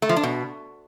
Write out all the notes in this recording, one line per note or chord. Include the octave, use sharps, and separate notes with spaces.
A3
F3
D4
B2